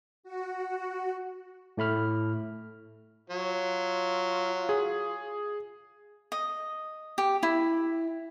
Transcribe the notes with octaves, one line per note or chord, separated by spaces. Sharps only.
F#4
A2 A3 B5 F6
F#3 F4
G#4
D#5
G4
E4